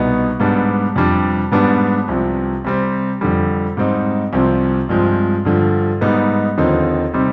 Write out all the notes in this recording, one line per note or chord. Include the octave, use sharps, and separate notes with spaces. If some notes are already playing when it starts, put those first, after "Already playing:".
Already playing: C2 B2 B3 D#4
G#2 G3 B3 D4
F2 C3 G3 D4
G#2 G3 B3 D4
C2 C3 F3
C3 G3 C4
F2 D3 G3
G#2 G3 C4 D#4
C2 C3 F3 C4
G2 F3 G#3 C4
G2 D3 F3
G#2 G3 B3 D#4
D#2 D3 F3 C4 D#4
C3 G3 C4 D#4